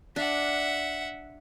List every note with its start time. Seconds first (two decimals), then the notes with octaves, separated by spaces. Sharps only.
0.16 D4 E5 F#5